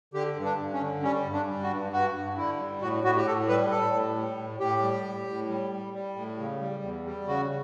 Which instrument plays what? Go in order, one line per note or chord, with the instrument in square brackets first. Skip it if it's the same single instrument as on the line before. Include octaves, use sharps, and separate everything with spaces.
[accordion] D3 G4
G2
D4
G2
C#4
D3
G3 C#4
G2
D4
G3
F#4
G2
G2 F#4
G2
D3 E4
G3
A2 F#4
A2 F#4
G4
A2 A4
G3 B4
A2 A4
A2
G3
A2
A2 G4
G3
A2
A2
G3
G3
G3
A2
C#3
G3
E2
G3
C#3 F#4